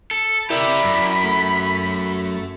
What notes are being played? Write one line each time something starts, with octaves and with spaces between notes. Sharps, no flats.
A4
E4 G4 A#4 D5 E5 B5 B6
F#2
A3